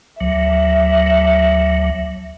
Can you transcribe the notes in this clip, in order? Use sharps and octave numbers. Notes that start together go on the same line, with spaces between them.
D2 F#3 E5